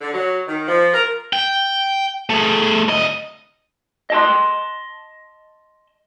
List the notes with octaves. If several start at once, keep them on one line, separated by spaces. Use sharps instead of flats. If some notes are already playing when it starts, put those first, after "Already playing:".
D3
F#3
D#3
F3
A#4
G5
A3 G#4
D2 D#5
D#5 A5 C6